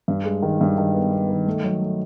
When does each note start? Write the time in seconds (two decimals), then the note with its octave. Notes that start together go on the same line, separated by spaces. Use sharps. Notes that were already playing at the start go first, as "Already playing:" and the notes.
0.08 G2
0.25 G#3
0.42 D#3
0.61 G2
0.78 D#3
0.94 B3
1.12 B3
1.29 D#3
1.47 A3
1.64 F#3
1.81 A3